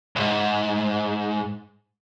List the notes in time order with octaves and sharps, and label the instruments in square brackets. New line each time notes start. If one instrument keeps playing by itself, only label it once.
[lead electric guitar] C2 G#2